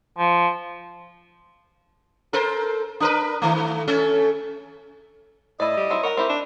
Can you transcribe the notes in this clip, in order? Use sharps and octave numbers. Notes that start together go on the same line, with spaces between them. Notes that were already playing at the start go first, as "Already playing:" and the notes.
F3
A4 A#4 C5
D4 A#4 B4
D#3 A3
A3 C#4 A4
A2 E4 D5 D#5
G3
F#3 C4 E4
A#4 C#5 F#5 A#5
C4 E4 G4
D4